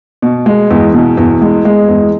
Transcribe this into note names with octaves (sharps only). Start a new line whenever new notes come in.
B2
G#3
E2
B2
E2
G#3
G#3
E2